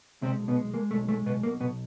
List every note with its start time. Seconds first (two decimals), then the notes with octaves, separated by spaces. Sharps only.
0.22 C3 G#3 C4
0.39 B1
0.48 B2 B3
0.57 G#3
0.74 G#3 A#3
0.91 B1 A3
1.08 G#3 A3
1.26 B1 B2 B3
1.43 B2 A#3
1.60 B1 B2 B3